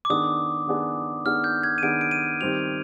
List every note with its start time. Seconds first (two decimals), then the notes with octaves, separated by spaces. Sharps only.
0.05 D6
0.10 D#3 B3 D4 G#4 D#6
0.67 D#3 B3 D4 G#4
1.25 D#3 B3 D4 G#4 F6
1.44 G6
1.63 G#6
1.78 D#7
1.82 D#3 B3 D4 G#4 D7
2.01 D7
2.11 D#7
2.40 D#3 G3 C4 G4 F7